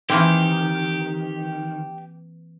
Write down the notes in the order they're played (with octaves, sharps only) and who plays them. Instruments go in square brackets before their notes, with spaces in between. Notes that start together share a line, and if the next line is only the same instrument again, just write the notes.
[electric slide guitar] D#3 [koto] E3 A#3 C4 [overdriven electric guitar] G4